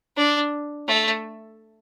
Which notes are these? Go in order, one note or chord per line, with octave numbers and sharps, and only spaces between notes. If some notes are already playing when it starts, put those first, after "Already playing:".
D4
A3